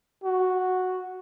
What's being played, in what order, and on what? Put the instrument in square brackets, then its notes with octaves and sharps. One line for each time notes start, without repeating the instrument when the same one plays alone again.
[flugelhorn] F#4